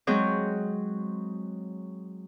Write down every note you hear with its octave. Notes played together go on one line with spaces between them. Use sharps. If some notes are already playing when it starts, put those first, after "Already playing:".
F#3 G#3 C4 G#4 C#5 G6